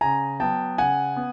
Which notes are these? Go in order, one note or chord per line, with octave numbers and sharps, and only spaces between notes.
C#3 G#5 A#5
F#3 B3 G5 A5
C#3 F#5 G#5
B3